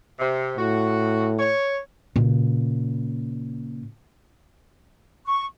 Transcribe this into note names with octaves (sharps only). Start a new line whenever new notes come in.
C3
A2 F#4
C#5
A#2 C#3
C#6